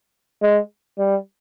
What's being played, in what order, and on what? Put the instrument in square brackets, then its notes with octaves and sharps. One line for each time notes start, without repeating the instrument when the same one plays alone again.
[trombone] G#3
G3